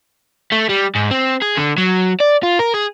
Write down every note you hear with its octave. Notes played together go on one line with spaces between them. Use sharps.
A3
G3
G#2
C4
G#4
D3
F#3
D5
F4
A#4
G#4